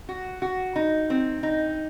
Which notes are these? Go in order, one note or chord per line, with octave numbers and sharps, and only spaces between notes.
F#4
F#4
D#4
C4
D#4